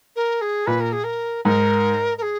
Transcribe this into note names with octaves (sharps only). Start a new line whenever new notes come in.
A#4
G#4
A#2 B4
A#4
G#4
A#4
G#2 A#4
A#4
G#4